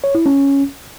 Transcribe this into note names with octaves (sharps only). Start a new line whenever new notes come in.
C#5
E4
C#4